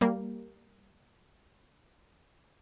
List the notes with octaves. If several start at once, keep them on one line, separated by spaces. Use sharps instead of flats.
G3 A#3